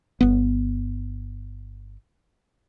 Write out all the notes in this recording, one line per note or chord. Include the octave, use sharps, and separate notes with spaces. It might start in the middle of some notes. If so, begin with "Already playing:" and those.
G1 B3